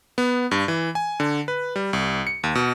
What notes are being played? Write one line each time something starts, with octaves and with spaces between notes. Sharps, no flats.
B3
G2
E3
G#5
D3
B4
G3
C2
C#7
D#2
B2